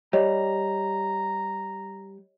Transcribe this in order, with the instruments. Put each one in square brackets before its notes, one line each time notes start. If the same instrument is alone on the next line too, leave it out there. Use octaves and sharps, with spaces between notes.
[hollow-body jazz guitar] G3 [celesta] G4 C#5 D#5 [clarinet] A#5